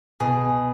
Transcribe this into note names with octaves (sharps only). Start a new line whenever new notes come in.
B2 G#4